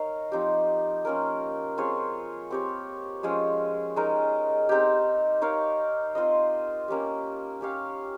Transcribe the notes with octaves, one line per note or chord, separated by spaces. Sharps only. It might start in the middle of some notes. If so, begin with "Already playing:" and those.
Already playing: D#4 A#4 C#5 F5
F3 C4 D#4 G4
A#3 C#4 F4 A#4
C4 F4 G#4 C#5
C4 G4 C#5
F3 G#3 C#4 G#4
G#3 D#4 A#4
C4 D#4 G4
D#4 A#4 C#5 F5
C4 F4 C5 D#5
A#3 C#4 G4
C#4 G4 C#5 F5